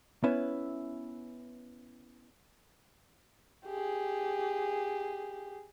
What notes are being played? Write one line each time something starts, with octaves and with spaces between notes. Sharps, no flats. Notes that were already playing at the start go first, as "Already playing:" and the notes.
B3 C#4 E4 B4 E5
G4 G#4